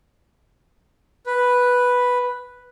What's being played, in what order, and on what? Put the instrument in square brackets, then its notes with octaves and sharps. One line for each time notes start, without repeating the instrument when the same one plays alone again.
[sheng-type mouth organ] B4